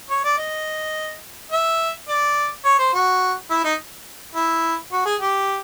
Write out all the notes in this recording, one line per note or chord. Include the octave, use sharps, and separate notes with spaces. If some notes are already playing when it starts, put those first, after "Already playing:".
C#5
D5
D#5
E5
D5
C#5
C5
F#4
E4
D#4
E4
F#4
G#4
G4